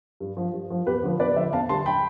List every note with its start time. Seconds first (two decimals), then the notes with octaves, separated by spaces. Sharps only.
0.20 G2
0.37 F3
0.53 G2
0.70 F3
0.87 E2 G4 B4
1.03 D3 F3
1.20 E2 B4 D5
1.36 D3 F3 C5 E5
1.53 E2 F5 A5
1.69 D3 G3 A5 C6
1.86 G5 B5